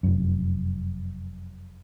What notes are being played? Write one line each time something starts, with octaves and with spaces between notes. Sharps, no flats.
F1 F#2